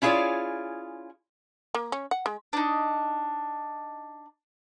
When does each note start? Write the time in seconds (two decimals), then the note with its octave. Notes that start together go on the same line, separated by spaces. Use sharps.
0.02 C#4 E4 F4 G#4 C#5 D5
1.75 A#3
1.92 C#4
2.11 F#5
2.26 G#3
2.53 D4 D#4